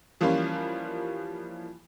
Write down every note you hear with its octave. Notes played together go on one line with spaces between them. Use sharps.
E3 F3 G3 A#3 C#4 F4